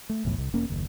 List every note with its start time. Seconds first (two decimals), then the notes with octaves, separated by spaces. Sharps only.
0.09 A3
0.25 B1 E2 A2
0.38 C2
0.53 E1 A#3 C#4
0.70 F#1 D#2